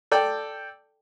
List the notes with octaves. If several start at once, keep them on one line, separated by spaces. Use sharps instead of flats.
A4 D5 G5